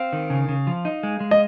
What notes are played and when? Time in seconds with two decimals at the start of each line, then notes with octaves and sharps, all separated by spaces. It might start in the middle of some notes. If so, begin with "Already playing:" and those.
Already playing: C4 F5
0.13 D#3
0.30 C#3
0.49 C#3
0.67 F3
0.85 D#4
1.03 G#3
1.20 G#3
1.31 D#5